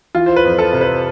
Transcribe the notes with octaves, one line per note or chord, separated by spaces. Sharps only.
E3 F4
C5
B4
F2
A4
C3
B4